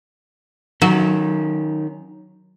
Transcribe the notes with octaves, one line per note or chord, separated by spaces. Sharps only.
D#3 F#3 C#4